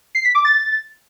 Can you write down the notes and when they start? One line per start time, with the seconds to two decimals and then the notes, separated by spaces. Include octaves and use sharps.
0.15 C7
0.25 B6
0.35 D6
0.45 A6